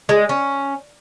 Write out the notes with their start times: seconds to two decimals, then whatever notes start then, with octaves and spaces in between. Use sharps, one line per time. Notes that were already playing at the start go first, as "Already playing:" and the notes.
0.09 G#3
0.29 C#4